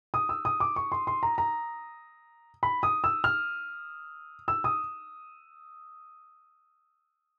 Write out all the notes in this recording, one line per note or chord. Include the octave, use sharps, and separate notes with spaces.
D#6
E6
D#6
D6
C#6
C6
C6
A#5
A#5
B5
D#6
E6
F6
E6
D#6